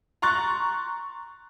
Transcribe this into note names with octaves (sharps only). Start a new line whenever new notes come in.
A#5 C6 C#6 F#6 A6